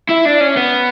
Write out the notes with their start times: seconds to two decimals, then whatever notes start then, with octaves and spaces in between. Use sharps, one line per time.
0.09 E4
0.25 D4
0.41 C#4
0.57 B3